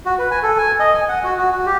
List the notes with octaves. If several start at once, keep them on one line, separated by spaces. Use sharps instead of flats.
F#4
B4
G#5
A4
G#5
D#5
G#5
F#5
F#4
F#4
F#4
G4